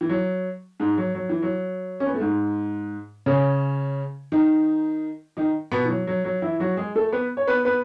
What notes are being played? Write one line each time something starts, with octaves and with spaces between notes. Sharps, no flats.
E3
F#3
G#2 G#3
F#3
F#3
E3
F#3
C#4
B3
A3
G#2 G#3
C#3 C#4
D#3 D#4
D#3 D#4
B2 B3
E3
F#3
F#3
F#3
E3 E4
F#3 F#4
G#3 G#4
A3 A4
B3 B4
C#5
B3 B4
B3 B4